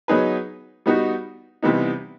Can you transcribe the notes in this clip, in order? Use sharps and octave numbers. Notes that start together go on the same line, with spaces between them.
F#3 B3 D#4 G#4 B4
G3 B3 D#4 F#4
C3 E3 G3 B3 D#4